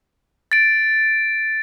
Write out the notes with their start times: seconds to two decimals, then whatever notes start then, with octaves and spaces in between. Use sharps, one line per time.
0.52 A6 D7